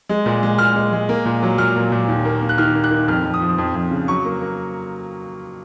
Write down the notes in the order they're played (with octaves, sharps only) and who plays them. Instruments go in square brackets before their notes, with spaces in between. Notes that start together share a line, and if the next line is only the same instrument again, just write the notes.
[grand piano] G#3
A#2
G#3
A#2 F6
G#3
G#3
A#3
A#2
F#3
A#2 F6
A#2
A#2
D#2
A#3
A#3
F#6
D#3 F6
A#3
F#6
D#3
F2 F6
F2
D#6
F3
F2
F2
C#3
F#3 C#6
A#3
A#3